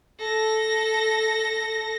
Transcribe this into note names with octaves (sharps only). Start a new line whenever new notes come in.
A4 A#6